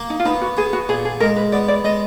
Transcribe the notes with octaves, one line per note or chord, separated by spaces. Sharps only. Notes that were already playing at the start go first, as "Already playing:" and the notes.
Already playing: A#3
D#4
F4
B3 D#4
F#4
B3 G#4
F#4
A#2 G#4
G#4
G#3 A#4
B4
B3 D5
D5
G#3 D#5